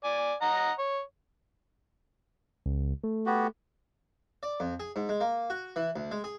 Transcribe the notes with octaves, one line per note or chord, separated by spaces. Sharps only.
D5 G#5
D#5 F#5 A#5
C#5
C#2
A3
B3 F#4 G4
D5
F2
G#4
G#2
G#3
A#3
F#4
E3
D2
G#3
G#4